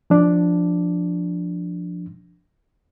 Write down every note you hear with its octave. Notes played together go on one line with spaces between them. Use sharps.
F3 D4